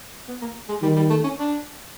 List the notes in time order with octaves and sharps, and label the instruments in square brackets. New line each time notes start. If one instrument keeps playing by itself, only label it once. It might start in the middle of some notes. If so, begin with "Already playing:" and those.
[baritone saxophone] B3
A#3
G#3
[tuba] D#3 [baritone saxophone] G3
[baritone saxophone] G3
A3
C#4
D4